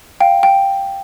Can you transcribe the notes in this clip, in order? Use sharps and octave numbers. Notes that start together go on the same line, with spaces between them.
F5 G5
G5